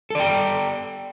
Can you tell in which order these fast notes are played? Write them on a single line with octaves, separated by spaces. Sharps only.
A4 D5 G5